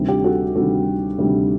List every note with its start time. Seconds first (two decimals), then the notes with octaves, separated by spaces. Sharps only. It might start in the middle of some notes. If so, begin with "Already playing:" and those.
Already playing: D2 C3 D#3 G3
0.08 G4
0.24 F#4 A4
0.55 D2 C3 D#3 G3 F#4 A4
1.18 D2 C3 D#3 G3